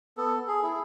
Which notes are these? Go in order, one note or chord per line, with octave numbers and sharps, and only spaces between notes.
B3 A4
G#4
E4